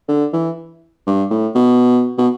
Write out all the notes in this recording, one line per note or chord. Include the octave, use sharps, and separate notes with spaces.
D3
E3
G2
A2
B2
B2